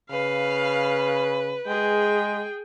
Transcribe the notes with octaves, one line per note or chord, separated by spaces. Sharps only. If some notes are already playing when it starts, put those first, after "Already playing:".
C#3 B4 F5
G#3 G#4 G5